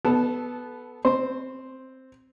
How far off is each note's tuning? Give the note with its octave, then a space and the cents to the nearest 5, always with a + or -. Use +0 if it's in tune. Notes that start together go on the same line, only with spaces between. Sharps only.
B3 +0 A4 -20 A5 +0
C4 +0 C5 +0